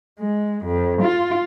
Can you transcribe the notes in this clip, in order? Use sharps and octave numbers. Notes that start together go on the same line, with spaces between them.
G#3
F2
F4